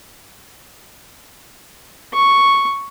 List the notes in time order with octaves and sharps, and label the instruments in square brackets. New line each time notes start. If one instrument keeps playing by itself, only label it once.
[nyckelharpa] C#6